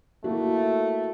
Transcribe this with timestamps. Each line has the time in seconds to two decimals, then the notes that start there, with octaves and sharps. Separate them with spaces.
0.24 A3 A#3 E4 F#4